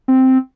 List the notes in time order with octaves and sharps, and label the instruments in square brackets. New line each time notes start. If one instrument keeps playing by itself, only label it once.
[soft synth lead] C4